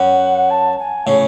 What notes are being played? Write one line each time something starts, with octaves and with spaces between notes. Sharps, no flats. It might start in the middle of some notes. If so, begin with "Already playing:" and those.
Already playing: F#2 F#5
A5
G#5
A2 C#3 C#5